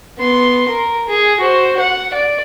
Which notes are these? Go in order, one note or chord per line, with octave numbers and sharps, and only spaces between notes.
B3 C6
A#4
G#4
F#4 C5
F#5
D5